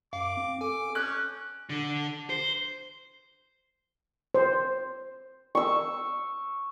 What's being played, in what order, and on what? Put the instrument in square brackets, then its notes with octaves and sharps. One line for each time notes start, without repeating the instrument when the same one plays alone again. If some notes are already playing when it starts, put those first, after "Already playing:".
[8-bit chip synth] F#2 [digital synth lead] F5 [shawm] D6
[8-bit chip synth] C4
[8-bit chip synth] A4 [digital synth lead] G#5 [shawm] D6
[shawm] C#4 [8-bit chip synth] C#6 G6 [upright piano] F#6
[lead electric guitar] D3
C5
[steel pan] C5
[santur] C#6 E6